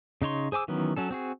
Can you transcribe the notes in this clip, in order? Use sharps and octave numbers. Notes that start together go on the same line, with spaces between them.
C#3 D#4 C#5 C6
G#4 C5 G#5 D6 E6
D#3 E3 F#3 B3 C#4
F#3 C#4 A4
C4 F#4 G#4